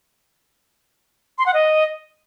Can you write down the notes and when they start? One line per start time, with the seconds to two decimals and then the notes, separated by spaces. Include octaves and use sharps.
1.38 C6
1.46 F#5
1.54 D#5